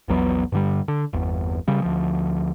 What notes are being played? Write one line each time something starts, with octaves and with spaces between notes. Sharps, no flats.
A#1 E2 F#3 B3
G2 D3 G3
D3
G1 E2
C#3 G3
D2 F3